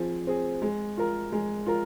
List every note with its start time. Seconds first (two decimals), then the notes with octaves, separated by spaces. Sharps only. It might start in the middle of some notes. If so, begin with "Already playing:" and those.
Already playing: F3 C4 G#4
0.27 C4 G#4
0.62 G#3
0.97 F4 A#4
1.32 G#3
1.66 F4 A#4